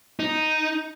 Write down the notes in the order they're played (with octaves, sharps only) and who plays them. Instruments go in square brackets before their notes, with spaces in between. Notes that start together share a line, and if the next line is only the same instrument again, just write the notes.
[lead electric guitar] D#4